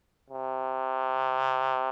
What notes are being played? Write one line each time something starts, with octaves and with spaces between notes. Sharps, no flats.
C3